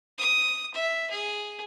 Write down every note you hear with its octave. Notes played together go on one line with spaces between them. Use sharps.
D#6
E5
G#4